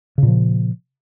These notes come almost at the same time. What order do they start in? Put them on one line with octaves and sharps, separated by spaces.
C#3 A#2 F3